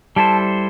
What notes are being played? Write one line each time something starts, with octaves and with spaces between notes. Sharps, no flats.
G3 E4 A4 C5 A5